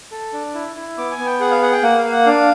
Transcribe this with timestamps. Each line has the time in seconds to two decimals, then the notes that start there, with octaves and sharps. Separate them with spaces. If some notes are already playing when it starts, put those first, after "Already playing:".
0.12 A4
0.33 D4
0.55 E4
0.76 E4
0.98 B3 D6
1.11 G#5
1.19 B3
1.26 G5
1.40 G#4 F#5
1.51 F5
1.62 G#4 F#5
1.73 G5
1.83 A#3 F#5
1.98 F5
2.05 A#3
2.12 F#5
2.26 D4 F5